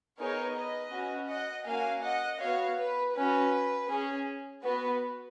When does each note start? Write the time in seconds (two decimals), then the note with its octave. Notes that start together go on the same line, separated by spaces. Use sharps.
0.18 B3 D#4 G#4 A#4 C#5
0.56 B4 D#5
0.93 C#4 F#4
1.30 D#5 F#5
1.67 A#3 C#4 F#4 F5 G#5
2.04 D#5 F#5
2.41 B3 F#4 C#5 F5
2.78 B4
3.15 C#4 F#4 B4
3.89 C#4 G#4
4.64 B3 F#4 B4